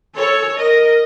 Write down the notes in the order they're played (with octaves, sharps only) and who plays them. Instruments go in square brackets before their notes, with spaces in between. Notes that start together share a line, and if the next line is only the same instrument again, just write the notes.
[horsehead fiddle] A4 [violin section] C#5
[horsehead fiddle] A#4 [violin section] D#5